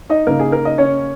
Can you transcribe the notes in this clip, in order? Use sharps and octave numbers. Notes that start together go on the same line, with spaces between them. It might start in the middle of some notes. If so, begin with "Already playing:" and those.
D#4 D#5
C#3 A#3 D#4 A#4
G#4
A#4
D#4 D#5
C#4 C#5